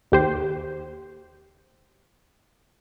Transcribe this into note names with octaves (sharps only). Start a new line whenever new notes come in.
D#2 G4 C5